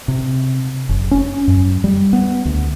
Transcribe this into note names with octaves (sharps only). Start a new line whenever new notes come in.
C3
F#1
C#4
F#2
G3
B3
D2